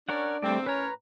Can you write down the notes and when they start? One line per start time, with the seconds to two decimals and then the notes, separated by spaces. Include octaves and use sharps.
0.09 C#4 D4 A#4 C#5 D5 F#5
0.42 E2 G2 G3 A3 C4 D5
0.66 A2 C#4 A#4 B4 C#5 A#5